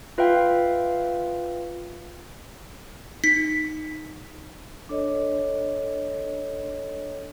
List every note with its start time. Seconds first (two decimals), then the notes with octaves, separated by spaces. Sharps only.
0.18 F4 B4 E5 F5 G5
3.24 D#4 B6
4.89 D4 A4 C#5 D#5